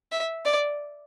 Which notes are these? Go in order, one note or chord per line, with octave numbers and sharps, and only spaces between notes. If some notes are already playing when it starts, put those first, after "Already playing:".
E5
D5